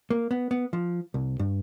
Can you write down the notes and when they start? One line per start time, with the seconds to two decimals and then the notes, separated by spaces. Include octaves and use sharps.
0.10 A#3
0.31 B3
0.51 B3
0.73 F3
1.14 C2
1.39 G2